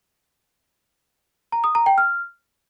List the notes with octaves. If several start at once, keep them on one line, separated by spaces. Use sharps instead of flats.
A#5
D#6
A#5
G5
F6